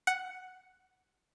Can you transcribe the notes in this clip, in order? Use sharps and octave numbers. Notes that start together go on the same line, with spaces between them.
F#5